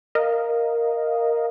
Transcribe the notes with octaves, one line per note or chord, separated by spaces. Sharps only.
A#4 D#5 F5